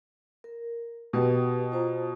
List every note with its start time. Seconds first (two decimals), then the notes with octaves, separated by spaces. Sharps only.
0.44 A#4
1.13 B2 G4 B4 G5
1.72 F4 C5 A#5